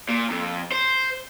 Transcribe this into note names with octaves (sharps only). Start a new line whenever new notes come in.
A#2
F2
C5